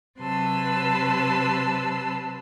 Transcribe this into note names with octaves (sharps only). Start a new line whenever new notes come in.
C3 F#3 B4 A5 C6 E6